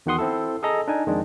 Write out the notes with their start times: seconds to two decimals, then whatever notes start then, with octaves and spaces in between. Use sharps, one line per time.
0.06 E2 D#3 F#4 F#5 C6 D#6
0.18 C4 E4 A4
0.63 G#4 A4 D#5 A#5
0.88 D4 D#4 G#5
1.07 F2 D#3 G#3 D4